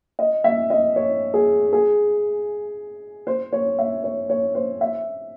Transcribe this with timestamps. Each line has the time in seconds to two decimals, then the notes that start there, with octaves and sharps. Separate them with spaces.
0.19 D#5
0.44 E5
0.70 D#5
0.96 C#5
1.34 G#4
1.73 G#4
3.27 C5
3.52 C#5
3.79 E5
4.04 C#5
4.29 C#5
4.55 C5
4.81 E5